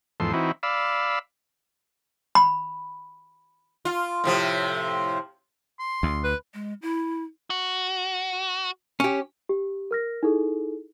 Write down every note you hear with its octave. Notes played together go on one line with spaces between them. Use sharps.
E2 G#2 F3 A4 C6
E3 C4 D#4 E4 F#4
D5 F5 B5 E6
B5
F4
A2 C3 F3
C6
D2
B4
G#3
E4
F#4
C#4 G4
G4
A#4 F6 A#6
D#4 E4 G#4 A4